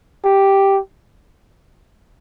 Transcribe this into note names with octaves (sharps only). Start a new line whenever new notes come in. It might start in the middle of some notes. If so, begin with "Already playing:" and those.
G4